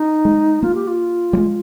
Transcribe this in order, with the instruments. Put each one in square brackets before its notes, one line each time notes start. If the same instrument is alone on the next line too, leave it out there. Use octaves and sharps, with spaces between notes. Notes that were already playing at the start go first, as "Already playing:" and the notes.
Already playing: [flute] D#4
[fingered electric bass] G#3
[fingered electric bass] A#3 [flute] F4
[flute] G4
F4
[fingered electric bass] G3
G#3